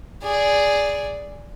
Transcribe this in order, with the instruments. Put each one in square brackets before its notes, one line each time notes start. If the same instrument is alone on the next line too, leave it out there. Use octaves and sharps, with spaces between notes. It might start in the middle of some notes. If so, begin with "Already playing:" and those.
[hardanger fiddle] G#4 D5